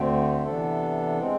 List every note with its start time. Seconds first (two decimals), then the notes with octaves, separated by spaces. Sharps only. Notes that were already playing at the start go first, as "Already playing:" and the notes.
Already playing: D2 D3 A3 C4
0.44 C3 E3 B3 D4 A4
1.18 G#3 C4